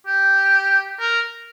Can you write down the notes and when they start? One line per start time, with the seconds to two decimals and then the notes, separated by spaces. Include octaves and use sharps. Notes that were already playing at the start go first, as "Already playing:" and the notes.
0.07 G4
0.99 A#4